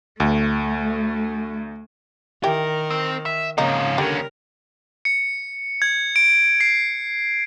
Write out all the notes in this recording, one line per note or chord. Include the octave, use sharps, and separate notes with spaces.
D2 A3
D#3 E3 G4 A#4
C4
E5
G#2 C#3 F3 A#3 C4 D#4 F5
D#2 D3 G3 C#4 A#4
C#7
G#6
D7
C7